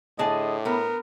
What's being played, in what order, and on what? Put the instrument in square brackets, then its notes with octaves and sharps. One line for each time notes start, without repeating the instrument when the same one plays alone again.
[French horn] A2 [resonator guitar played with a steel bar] D3 G#4 A5 [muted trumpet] D#5
[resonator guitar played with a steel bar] B3 [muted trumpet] A#4